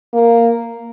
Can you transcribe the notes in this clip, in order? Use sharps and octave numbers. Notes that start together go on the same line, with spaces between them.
A#3